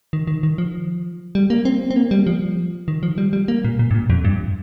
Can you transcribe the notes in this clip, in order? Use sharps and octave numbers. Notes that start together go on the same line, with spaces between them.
D#3
D#3
D#3
F3
G3
A#3
C4
C4
A#3
G3
F3
D#3
F3
G3
G3
A#3
A#2
A#2
G2
A#2
F2
G2